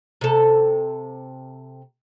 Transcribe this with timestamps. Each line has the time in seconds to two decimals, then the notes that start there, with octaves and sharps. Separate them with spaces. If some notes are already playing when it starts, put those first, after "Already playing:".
0.21 C3 A4